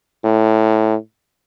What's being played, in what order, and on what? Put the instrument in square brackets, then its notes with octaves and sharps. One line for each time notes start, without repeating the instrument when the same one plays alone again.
[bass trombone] A2